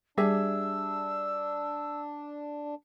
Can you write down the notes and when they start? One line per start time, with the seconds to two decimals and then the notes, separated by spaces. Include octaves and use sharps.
0.18 G3 D4 G4 G#4 E5 E6